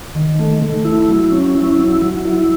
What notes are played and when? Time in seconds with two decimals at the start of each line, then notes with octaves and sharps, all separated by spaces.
0.15 D#3
0.39 A3
0.62 A3
0.85 E4
1.08 F#3
1.32 C#4
1.55 E4
1.78 F#3
2.01 F#3
2.25 E4